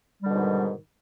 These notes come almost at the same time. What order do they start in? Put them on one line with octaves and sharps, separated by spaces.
G3 D3 B2 G#2 D#3